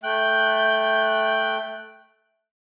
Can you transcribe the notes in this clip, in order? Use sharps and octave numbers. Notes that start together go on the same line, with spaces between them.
A3 G5 F#6 G6